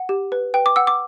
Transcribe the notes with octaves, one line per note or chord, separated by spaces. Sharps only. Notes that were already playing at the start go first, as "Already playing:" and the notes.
Already playing: F#5
G4
B4
B4 G5
D6
F#5 E6
D6